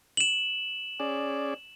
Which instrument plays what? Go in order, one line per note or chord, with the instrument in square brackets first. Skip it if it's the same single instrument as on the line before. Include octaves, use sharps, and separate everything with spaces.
[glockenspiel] E7 F#7
[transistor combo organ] C#4 G#4 D5